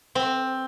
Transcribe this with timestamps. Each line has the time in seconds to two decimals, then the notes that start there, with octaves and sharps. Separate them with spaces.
0.15 C4